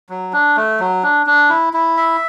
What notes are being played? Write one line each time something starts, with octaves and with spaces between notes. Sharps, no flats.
F#3
D4
A3
F#3
D4
D4
E4
E4
E5